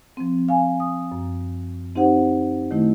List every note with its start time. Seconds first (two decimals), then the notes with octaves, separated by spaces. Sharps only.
0.17 F3 C4
0.49 F5 G#5
0.80 D#6
1.12 F#2
1.95 C4 D#4 G4 C5 F#5
2.71 D#3 A3 E4